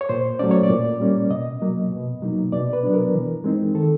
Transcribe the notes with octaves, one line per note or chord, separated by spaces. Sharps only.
C#5
A#2 C5
F#3 A3 C#4 D5
C#5
D5
A#2
G3 A#3 C#4
B2 D#5
F#3 A#3
B2
F#3 A#3 D#4
B2 D5
B4
F#3 B3 D4
A#4
E3
G#3 C4 D#4
D#3 A4